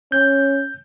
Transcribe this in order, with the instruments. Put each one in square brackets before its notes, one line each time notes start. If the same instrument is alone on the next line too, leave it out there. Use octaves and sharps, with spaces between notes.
[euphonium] C#4 [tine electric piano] G6